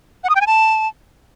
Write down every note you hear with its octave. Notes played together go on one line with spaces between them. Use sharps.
F#5
D#6
G5
G#5
A5